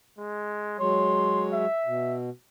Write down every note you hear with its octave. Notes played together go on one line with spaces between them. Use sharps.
G#3
F#3 G#3 C#5 C6
E5
B2